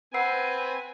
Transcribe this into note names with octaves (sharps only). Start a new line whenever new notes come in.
C4 B4 F#5 G#5 E6 C7